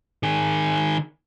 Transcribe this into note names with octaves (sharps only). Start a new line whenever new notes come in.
D#3 G#4